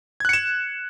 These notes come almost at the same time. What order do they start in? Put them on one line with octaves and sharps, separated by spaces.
G#6 F#6 C#7 E7